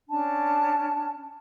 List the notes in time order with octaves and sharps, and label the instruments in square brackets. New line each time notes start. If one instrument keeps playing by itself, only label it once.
[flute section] C#4 D4 A5